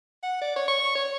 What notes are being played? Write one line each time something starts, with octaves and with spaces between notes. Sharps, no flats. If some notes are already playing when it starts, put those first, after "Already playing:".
F#5
D5
C#5
C#6
C#5